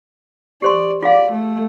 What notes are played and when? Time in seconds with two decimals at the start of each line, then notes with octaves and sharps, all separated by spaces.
0.62 G4 C5 D5 C6
1.03 F4 G#4 D5 F5
1.33 A3